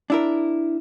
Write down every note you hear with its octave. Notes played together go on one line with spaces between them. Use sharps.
D4 E4 A#4